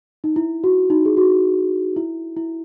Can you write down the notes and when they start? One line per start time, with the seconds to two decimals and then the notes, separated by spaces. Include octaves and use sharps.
0.24 D#4
0.36 E4
0.64 F#4
0.90 D#4
1.05 G#4
1.17 F#4
1.96 E4
2.37 E4